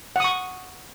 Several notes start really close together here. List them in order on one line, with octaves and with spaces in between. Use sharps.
F#5 D#6 C#6